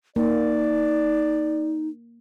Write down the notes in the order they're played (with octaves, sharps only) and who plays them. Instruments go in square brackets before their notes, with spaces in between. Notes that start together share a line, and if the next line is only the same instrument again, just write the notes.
[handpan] A#3 [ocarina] D#4 [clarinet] D5